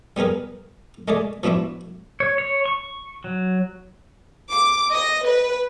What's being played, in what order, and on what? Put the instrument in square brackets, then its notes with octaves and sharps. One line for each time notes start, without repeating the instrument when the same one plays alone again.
[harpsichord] G3 B3 G#4 A#4 B4
G#3 A3 G#4 D5
F3 B3 D4 E4 F#4
[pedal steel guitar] C#5
C#5
C#6
F#3
[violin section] D6
D#5
B4